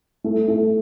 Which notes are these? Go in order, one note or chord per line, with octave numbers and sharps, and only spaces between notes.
A3
A3